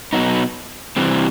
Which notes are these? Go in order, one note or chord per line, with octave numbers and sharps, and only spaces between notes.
B2 F#3 B3 D#4
C3 E3 G3 C4